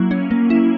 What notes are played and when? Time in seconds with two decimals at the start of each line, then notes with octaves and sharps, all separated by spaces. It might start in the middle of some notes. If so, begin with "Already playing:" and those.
Already playing: F#3 A#3 E4
0.11 C#4
0.31 A#3
0.50 E4